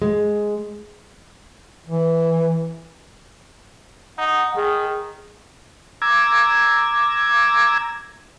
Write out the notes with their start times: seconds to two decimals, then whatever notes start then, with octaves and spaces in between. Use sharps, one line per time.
0.02 G#3
1.87 E3
4.18 D#4 F#5
4.56 D#3 G#4
6.02 A#5 D6 E6 G#6